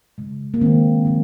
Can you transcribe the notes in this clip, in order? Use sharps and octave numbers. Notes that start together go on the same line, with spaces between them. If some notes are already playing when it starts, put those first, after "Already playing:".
C#3 G#3
A#3
D#3 G#3 C4
D#3 F#3